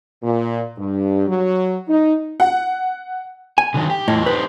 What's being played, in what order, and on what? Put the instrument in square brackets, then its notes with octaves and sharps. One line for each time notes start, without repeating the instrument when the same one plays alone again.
[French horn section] A#2
G2
F#3
D#4
[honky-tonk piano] F#5
[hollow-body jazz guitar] G#5
[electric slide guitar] D3 D#3 F#3
G4
[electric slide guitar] E2 F4 D#5 [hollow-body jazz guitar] A2
[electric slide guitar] D#4 G4 C5 [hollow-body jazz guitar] B4